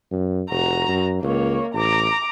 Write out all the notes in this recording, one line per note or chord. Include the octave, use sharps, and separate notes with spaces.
F#2
F1 F#4 A#5
F#2
C#2 A#3 C#5
A1 A#5 D6